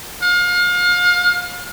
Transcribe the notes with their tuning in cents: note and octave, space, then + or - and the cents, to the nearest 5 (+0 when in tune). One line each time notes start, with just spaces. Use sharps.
F5 +35